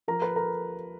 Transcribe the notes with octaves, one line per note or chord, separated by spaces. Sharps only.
F3 A#4 A#5
B4 B5
A#4 A#5